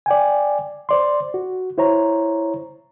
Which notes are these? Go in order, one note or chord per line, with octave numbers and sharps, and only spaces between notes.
D5 G5 G#5
C5 D5 C6
F#4
E4 C5 C#5 A#5